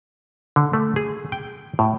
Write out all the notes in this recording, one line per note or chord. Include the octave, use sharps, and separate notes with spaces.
D3
A3
G#4
G5
A2